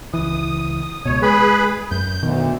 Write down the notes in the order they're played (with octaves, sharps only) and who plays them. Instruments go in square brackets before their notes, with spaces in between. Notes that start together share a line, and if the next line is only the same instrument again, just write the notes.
[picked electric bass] C#2 E3 [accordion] D#6
[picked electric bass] C#2 B2 [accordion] C#5
[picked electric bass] G#3 [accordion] G#4 B4 B5
[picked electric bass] F#2 [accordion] G6
[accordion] D2 [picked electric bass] B2 D#3